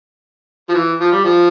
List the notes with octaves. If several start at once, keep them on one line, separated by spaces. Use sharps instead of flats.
F3
E3
F3
G3
F3